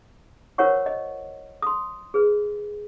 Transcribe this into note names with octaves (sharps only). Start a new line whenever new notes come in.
F4 A#4 C5 C#5 F#5 C#6
D#5
C6 D#6
G#4 B4